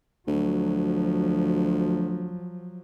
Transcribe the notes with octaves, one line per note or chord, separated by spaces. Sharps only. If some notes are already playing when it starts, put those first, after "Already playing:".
D2 F3 F#3